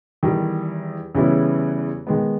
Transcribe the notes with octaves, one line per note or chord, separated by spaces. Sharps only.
E2 D#3 G3
E2 C#3 G3 B3 E4
D#3 G#3 B3